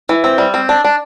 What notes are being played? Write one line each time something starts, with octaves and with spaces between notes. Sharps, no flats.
E3
C4
G3
C4
D4
D4